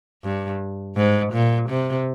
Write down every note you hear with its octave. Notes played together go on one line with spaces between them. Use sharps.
G2
G#2
A#2
C3